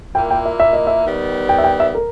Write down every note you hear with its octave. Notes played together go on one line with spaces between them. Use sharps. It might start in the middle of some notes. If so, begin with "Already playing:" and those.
A#2 A#3 E4 G5
G5
E5
E5
D#5
E5
D#3 G3 B3
G5
E5
G5
E5
A#4